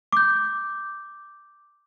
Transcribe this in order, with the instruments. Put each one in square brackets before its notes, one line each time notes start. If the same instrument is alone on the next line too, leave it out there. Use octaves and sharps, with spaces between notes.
[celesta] D6 G6